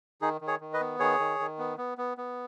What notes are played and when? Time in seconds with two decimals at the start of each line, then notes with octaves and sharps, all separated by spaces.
0.21 D#3 D#4 G#4
0.41 D#3
0.47 G#4 C#5
0.61 D#3
0.73 B4 D#5
0.80 B3
1.00 D#3 G#4 C#5
1.19 D#3
1.40 D#3
1.58 B3
1.78 B3
1.98 B3
2.17 B3